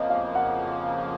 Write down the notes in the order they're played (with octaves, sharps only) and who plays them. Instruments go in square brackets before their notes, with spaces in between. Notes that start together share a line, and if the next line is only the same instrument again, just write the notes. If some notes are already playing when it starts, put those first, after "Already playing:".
Already playing: [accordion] F2 C#3 F3 A#3 [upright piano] D#5
[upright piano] F5
F#5